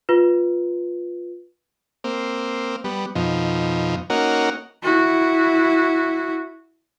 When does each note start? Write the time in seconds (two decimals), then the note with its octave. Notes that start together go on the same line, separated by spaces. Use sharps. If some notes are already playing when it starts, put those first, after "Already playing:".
0.09 F4 B4
2.04 A#3 C4
2.84 G3 B3
3.15 F2 B2 F3 D#4
4.10 A#3 C#4 D#4 F#4 A#4 F#5
4.83 E4 F#4